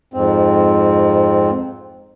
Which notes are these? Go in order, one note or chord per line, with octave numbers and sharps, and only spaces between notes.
F2 G#2 C4